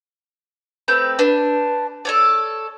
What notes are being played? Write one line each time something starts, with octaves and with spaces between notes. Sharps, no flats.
A3 C4 B4 G6
D4 B4
A4 C#5 D5